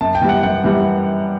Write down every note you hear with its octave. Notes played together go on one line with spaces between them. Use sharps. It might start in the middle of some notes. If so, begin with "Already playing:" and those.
F#2 A5
G5
E3 G3
F#5
F#2 F#5
E3 G3